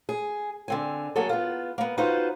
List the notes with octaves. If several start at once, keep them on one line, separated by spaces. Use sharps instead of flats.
G#4
D3 C4 G#5
F#3 A#3 F#4 G#4 A4
B3 F4
A#3 B3
D#4 F4 F#4 B4 C5